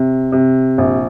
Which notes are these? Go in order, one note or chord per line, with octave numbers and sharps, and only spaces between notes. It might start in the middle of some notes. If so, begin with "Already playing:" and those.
Already playing: C3
C3
A#1